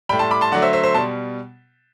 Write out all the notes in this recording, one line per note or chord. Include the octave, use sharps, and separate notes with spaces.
A2 G3 G5 B5
A5 C6
B5 D6
A5 C6
D3 F#3 A3 D5 F#5
C5 E5
C5 E5
C5 E5
B2 G3 A5 C6